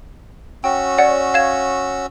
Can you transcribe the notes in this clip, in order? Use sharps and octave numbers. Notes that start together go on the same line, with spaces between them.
C#4 F#4 G5 E6
C#5 D5 F#5
F5 G#6 E7